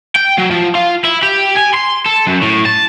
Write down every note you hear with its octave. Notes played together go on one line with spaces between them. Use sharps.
G5
F#3
F3
F4
E4
G4
G#5
C6
A4
F#2
A2
A5